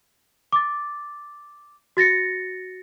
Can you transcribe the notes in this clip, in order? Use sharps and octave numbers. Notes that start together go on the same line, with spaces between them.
D6 A6
F#4 A6 A#6 C#7